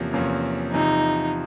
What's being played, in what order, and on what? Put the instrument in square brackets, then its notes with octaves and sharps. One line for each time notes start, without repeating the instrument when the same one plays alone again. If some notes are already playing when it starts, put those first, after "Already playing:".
Already playing: [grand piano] E2 C3 F3 A#3 C#4
E2 C3 F3 A#3 C#4
[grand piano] E2 C3 F3 [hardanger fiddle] D#4